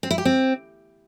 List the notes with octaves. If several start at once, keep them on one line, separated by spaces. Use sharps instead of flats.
C4
E4
G4
C4